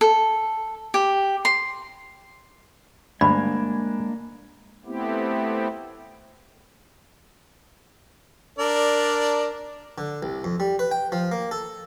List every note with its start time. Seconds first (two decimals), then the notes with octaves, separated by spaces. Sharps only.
0.01 A4
0.94 G4
1.45 C6
3.21 D2 G2 G#3 A#3 D4 G#5 B5
4.86 A3 B3 C4 E4 G4
8.59 D4 A#4 D5
9.98 D3
10.23 C2
10.44 F2
10.60 G3
10.79 B4
10.91 G5
11.12 F3
11.32 A#3
11.51 A4